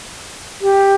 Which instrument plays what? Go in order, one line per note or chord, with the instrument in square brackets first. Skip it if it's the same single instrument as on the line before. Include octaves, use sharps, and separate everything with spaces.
[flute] G4